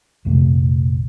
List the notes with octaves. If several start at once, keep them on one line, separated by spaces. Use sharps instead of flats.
A#1 F2 C3 A3